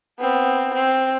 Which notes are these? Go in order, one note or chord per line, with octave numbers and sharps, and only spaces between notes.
B3 C4
C4